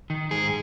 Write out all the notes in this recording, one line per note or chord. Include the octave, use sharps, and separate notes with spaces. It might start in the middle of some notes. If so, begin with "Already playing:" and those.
D#3
G#2 G#4